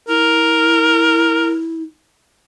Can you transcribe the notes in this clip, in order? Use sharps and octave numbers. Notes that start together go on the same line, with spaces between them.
E4 A#4